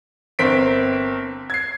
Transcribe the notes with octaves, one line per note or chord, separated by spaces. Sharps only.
G1 C4 A#4 B6 D7
G#6 C7